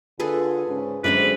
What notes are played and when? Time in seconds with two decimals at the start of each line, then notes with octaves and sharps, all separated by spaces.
0.20 D3 F4 G#4 A4 B4
0.67 G#2 C#3
1.04 F#2 D3 G#3 C4 B4 C5 D5